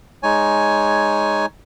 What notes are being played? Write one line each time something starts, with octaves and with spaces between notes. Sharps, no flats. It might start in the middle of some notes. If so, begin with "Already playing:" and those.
G#3 D#4 C#5 G#5